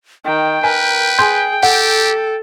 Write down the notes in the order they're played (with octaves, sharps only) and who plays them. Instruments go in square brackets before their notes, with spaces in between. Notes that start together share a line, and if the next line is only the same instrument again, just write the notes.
[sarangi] D#3 [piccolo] G5
[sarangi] A#4 [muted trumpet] B4 [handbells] G#5
[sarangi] G#4 [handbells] C6 G6
[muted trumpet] G4 [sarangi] A4 [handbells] F#5